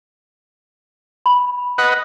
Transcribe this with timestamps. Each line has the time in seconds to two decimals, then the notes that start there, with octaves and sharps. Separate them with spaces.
1.26 B5
1.78 B4 D#5 F#5